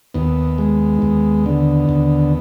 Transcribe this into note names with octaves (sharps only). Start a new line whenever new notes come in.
D#2 B3
G#3
D#2
D3
D#2